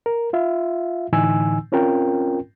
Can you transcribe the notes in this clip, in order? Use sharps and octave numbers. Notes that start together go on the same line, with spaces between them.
A#4
F4 E5 F5
A2 D3 E3 D#4 G#5 E6
C4 C#4 F4 A#4 G5